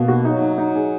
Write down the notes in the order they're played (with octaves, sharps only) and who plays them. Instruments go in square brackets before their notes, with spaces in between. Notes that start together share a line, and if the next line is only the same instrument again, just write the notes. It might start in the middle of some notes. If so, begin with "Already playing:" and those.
Already playing: [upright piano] B2 [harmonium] A#3
[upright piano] F#4
[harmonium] F#3 [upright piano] D#4
[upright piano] D#4
D#4
G#4